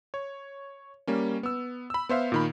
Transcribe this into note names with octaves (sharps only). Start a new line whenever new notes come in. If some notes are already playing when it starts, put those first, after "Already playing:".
C#5
G3 A#3 C#4
B3 E6
B5 E6
B3 C5 E5 F5
A#2 D#3 B5